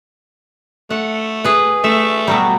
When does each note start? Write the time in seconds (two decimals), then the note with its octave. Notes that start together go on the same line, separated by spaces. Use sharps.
0.90 A3 F#5
1.44 G#4 B4
1.84 A3 E5
2.28 B2 F#3 G3